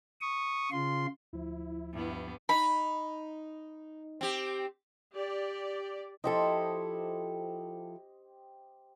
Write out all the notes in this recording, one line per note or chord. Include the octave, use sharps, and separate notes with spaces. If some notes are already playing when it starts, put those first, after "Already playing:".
C#6 D#6
C#3 F4 C6
D2 F3 E4
G2 B3
D#4 B5
C4 G4
G4 D5
F3 E4 G4 A4 C5 D#5